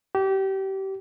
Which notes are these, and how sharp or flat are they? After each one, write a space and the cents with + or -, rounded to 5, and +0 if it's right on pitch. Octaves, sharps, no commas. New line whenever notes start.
G4 -25